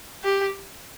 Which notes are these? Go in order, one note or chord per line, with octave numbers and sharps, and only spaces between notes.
G4